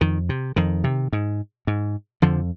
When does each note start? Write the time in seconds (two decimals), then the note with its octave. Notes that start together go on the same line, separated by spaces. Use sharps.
0.01 F2 D#3
0.29 C3
0.56 F2 D#3
0.84 C3
1.13 G#2
1.67 G#2
2.22 F2 D3 F3